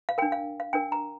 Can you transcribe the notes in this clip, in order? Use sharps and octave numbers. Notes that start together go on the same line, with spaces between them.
F5
D4 A#4 G5
F5
F5
D4 A#4 G5
A#5